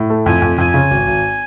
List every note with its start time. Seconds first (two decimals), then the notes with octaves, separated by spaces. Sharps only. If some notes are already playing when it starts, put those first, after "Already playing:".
Already playing: A2
0.10 A3
0.26 F2 G#5
0.42 F2
0.58 F2 G#5
0.74 C#3
0.91 G#1
1.07 G#1